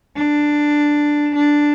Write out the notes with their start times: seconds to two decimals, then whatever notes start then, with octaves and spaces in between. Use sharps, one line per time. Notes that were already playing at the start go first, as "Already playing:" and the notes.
0.16 D4
1.35 D4